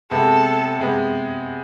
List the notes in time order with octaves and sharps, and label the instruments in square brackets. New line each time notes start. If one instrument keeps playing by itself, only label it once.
[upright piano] C3 G#3 B3 [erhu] A4
[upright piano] C3 G#3 B3